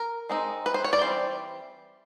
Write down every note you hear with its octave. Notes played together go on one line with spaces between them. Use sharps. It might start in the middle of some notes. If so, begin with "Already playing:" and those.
Already playing: A#4
G#3 C4 D#4
B4
C5
C#5
D5
E3 G3 C4 C5